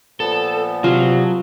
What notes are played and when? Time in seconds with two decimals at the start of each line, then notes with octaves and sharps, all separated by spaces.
0.20 A#2 F3 B3 A4
0.84 C3 F#3 F4